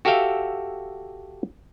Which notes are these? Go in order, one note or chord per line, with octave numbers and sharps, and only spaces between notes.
F#4 G4 A4 E5 F5 G5